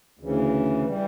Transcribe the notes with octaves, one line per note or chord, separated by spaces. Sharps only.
D2 C#3 E3
E3 G3